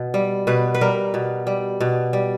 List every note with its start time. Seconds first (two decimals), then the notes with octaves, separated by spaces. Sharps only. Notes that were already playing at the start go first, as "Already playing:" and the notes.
Already playing: B2
0.14 G3
0.47 B2 B4
0.74 B4
0.81 G3 A#4
1.14 B2
1.47 G3
1.80 B2
2.13 G3